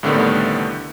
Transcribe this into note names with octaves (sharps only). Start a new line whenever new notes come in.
C2 A2 D3 D#3 A3 B3